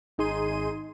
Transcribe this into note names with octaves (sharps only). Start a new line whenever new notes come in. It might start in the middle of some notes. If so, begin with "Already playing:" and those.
G#1 D#4 G#4 C6 D#7